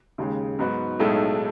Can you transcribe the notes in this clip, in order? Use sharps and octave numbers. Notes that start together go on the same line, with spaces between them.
D#2 C#3 G#3
G#2 F#3 B3 D#4 F#4
B1 A2 G#3 D#4 A4